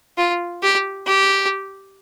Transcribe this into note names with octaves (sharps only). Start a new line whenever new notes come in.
F4
G4
G4